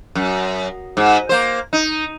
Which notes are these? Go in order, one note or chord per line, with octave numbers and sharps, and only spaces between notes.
F#2
G#2
A#3 C5
D#4